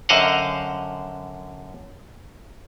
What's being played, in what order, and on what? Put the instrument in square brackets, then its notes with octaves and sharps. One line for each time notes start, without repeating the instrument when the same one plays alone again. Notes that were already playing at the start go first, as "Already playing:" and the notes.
[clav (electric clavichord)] F#2 D3 C5 D#5 F5 F#5